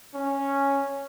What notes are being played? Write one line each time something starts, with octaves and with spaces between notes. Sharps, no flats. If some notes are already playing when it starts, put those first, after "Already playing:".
C#4